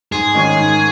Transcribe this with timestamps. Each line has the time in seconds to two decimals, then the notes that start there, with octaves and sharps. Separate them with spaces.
0.12 G#2 G#4
0.34 D#3 G#3 C#4
0.57 G#2